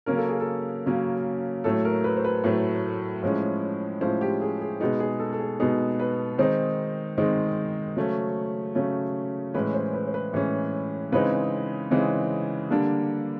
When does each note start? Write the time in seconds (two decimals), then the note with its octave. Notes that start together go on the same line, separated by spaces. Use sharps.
0.06 C#3 F#3 A#3 C#4 A#4
0.17 A4
0.29 G#4
0.40 A4
0.86 C#3 F#3 A#3 C#4
1.64 A2 F#3 A3 A4
1.85 A#4
2.04 B4
2.17 C5
2.25 B4
2.44 A2 F#3 A3
3.23 A2 F3 G#3 C#4
4.01 A2 F3 G#3 C#4 C5
4.21 G4
4.41 G#4
4.61 G#4
4.80 B2 G#3 B3 D#4 G#4
5.00 G#4
5.19 A4
5.33 A4
5.40 G#4
5.60 B2 G#3 B3 D#4 G#4
6.00 B4
6.38 D#3 G#3 C4 D#4 C5
7.18 D#3 G#3 C4 D#4
7.97 C#3 F#3 A3 C#4
8.75 C#3 F#3 A3 C#4
9.54 A2 E3 G#3 C#4 B4
9.74 C5
9.93 B4
10.08 C5
10.14 B4
10.33 A2 E3 G#3 C#4
11.12 C#3 E3 G#3 C4 D#4 B4
11.91 C#3 E3 G#3 C4 D#4
12.70 D3 G3 A#3 D4